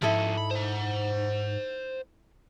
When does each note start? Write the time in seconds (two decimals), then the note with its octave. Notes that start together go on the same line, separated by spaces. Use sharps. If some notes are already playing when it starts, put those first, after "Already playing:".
0.02 G#2 F3 C#4 E4 A4 D#5
0.38 B5
0.51 C5 F#5